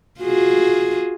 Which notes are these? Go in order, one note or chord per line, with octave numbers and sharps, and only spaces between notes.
F4 F#4 G#4